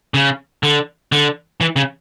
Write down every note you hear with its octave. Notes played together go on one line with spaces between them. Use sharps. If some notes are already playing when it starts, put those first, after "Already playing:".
C#3
D3
D3
E3
C#3